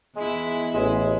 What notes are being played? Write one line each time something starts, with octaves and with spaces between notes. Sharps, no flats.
E2 G#3 E4
A1 G#3